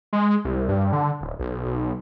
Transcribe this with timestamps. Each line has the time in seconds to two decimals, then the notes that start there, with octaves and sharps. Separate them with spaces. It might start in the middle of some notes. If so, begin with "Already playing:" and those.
0.13 G#3
0.45 C2
0.69 G2
0.93 D3
1.21 D1
1.39 B1
1.65 B1